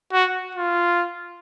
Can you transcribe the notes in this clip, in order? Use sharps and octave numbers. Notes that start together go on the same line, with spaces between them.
F#4
F4